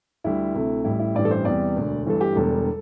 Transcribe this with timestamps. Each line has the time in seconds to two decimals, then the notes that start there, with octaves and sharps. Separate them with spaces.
0.24 D2 D3 G3 E4
0.55 D2 C3 A3
0.84 A1 A2 G3 E4
0.99 E4
1.15 A1 G2 E3 G3 D5
1.25 A4
1.31 C5
1.45 E2 C3 E3 G3 D5
1.76 E1 D2 D3
2.06 G1 G2 E3 A3 A4
2.21 G4
2.36 E1 E2 D3 G3 A4